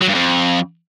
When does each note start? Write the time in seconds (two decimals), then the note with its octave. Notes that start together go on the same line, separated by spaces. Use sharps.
0.01 F#3
0.08 G2
0.14 F2